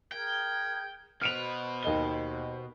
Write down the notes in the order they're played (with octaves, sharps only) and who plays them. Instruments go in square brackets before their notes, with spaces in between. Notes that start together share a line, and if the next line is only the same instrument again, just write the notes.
[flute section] G#4 A#4 G#6 [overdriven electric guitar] G5
[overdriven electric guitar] B2 B4 [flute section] C5 [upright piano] F6 D7 F7
[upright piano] D#2 D#5 G7